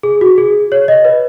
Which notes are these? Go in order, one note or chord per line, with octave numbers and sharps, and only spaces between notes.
G#4
F#4
G#4
C#5
D#5
B4